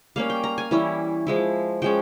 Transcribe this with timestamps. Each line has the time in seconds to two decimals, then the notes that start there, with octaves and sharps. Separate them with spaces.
0.16 G3 A#3 C#4 F5
0.30 G5
0.44 A#5
0.58 G#5
0.71 E3 G3 C#4 E4
1.27 F3 G#3 E4
1.82 F3 G#3 C#4 G5